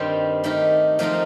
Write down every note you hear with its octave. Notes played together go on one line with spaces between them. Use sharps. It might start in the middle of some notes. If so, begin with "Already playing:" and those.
Already playing: G2 D#3 G3 C4 G4
D#3 A3 D#4 G4 A#4
F3 A3 C4 D#4 A#4